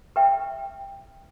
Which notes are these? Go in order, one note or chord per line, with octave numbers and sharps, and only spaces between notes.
B4 E5 G5 C#6